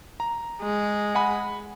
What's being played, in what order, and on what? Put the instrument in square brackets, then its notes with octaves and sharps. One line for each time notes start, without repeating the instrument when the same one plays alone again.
[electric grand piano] A#5
[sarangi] G#3
[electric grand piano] F#5 G#5 B5